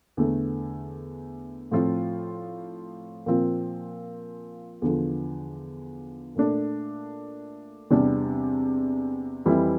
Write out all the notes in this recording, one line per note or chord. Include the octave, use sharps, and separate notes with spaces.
E2 D3 A3
A2 F3 C4 F4
A#2 F3 C4 F4
E2 D3 F3
A#2 A3 D4
E2 C3 G3 D4
F2 E3 G3 C4 E4